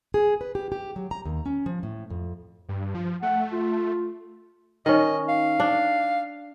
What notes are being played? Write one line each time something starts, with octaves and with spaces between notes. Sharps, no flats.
G#4
B4
G4
G4
F#3
A#5
D#2
C#4
F3
A2
F2
G2
F3
A3 F#5
F4
D#3 C#4 D#5
F5
D4